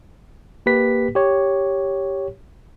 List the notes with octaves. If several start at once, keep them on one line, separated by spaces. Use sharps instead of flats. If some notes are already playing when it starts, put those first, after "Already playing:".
A#3 G4 B4 B6
G4 C#5